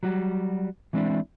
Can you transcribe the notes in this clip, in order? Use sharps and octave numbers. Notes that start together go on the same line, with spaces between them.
F#3 G3 F#4
E3 G#3 C4 D4 E4